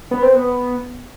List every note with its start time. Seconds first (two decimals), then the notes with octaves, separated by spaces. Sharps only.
0.11 B3
0.23 C4
0.35 B3